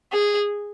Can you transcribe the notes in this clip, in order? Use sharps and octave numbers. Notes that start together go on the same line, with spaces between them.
G#4